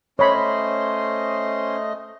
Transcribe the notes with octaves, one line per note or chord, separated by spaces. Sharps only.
A3 C#4 C5 C#5 D#5 B5 C6